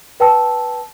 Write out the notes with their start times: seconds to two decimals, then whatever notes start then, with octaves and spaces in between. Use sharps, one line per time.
0.20 B4 G5 A5 E6